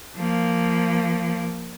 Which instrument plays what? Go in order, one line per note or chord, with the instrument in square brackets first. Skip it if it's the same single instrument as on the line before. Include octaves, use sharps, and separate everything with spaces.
[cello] F3 A#3